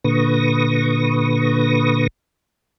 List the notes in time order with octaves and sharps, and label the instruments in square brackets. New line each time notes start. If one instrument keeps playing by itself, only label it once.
[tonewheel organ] A#2 D3 B4 C#6 D#6 A#6